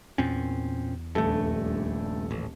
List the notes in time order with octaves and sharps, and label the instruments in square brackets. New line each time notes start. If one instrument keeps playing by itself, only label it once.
[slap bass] E2 [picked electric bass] A#2 C4 C#4
[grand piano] D#1 A#1 A4 [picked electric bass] G2 A3
[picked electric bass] A1